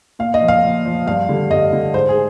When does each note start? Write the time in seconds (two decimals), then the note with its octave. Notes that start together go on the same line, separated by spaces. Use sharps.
0.19 A#2 F5
0.34 D#5
0.41 F3
0.48 F5
0.63 A#2
0.85 F3
1.06 G2 F5
1.29 D3 G3
1.51 G2 D#5
1.73 D3 G3
1.94 G#2 C5
2.09 G#4